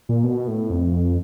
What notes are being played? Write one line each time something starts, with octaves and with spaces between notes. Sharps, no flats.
A#2
B2
A2
F2